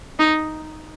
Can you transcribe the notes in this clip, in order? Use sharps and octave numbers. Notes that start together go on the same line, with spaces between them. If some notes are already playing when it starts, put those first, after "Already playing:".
D#4